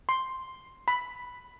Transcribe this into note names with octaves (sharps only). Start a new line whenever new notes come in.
C6
B5